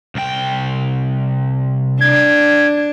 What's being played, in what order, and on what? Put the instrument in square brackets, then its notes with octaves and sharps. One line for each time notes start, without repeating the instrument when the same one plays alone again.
[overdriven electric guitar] C2 G5
[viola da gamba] D4 [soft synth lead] G#6